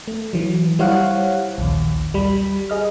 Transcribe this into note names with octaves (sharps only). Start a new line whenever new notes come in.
A3
E3 F#3
G3 E4 C5 C#5 F5 F#5
A#1 D#2
G3 B5
G#4 D#5 F6